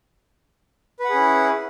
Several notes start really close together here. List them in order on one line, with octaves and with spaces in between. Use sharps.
B4 F#5 G#4 C#4 E4